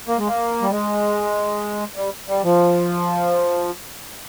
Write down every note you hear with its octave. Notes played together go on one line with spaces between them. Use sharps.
A#3
G#3
A#3
G3
G#3
G3
G3
F3